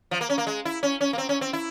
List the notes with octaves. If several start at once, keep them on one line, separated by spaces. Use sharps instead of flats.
F3
A#3
C#4
A#3
G#3
E4
C#4
C#4
A#3
C4
C#4
C4
E4